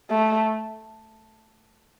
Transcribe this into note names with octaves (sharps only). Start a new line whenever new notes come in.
A3